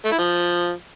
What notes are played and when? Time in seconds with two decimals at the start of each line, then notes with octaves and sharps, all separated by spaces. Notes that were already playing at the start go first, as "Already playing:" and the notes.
0.05 A3
0.12 E4
0.19 F3